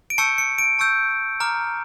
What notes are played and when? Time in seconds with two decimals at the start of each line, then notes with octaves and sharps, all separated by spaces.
0.10 D7
0.18 A5 C#6 E6 G6 C#7
0.38 C#7
0.58 D7
0.79 A5 C#6 E6 G6
1.40 A#5 D6 F6